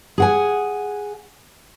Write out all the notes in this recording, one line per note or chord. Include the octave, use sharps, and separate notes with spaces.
G#4 F#5 G#5